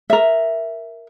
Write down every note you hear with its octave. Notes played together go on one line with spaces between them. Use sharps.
A#4 E5